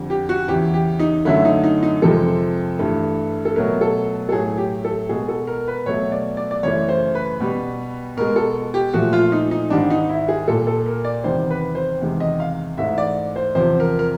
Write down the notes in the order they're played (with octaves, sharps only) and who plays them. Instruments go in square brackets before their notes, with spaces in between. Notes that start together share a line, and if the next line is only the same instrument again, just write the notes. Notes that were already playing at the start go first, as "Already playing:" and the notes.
Already playing: [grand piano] F2 D3 G3
G4
F#4
E2 C#3 E3 G4
G4
D#4
F#2 D3 F#3 A3 E4
D#4
D#4
D#4
F2 C3 F3 G#3 A4
G2 E3 A3
A4
B2 F#3 A3 A#4
A4
A4
A2 F#3 A3 G#4
G4
A4
B2 G#3 G#4
A4
A#4
B4
B2 F#3 A3 C#5
D5
D5
D5
F#2 C#3 E3 A3 C#5
C5
B4
B2 G3
B2 G#3 A#4
A4
G4
A#2 F3 A3 F#4
F4
D#4
D#4
G#2 D#3 G3 D4
D#4
E4
G#4
A#2 G3 A4
A4
A#4
D5
E2 C3 D#3 G3 C5
B4
C5
E2 C3 D#3 G#3
D#5
F5
G#2 E3 A3 E5
D5
C5
E2 C3 F3 C5
A#4
A#4